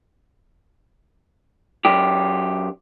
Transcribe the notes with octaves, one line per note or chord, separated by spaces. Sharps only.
F#2 G4